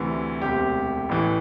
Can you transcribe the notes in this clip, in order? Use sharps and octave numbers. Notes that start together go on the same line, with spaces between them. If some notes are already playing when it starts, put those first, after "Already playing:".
Already playing: D2 C3 E3
E1 D2 C3 G4
A1 A2 E3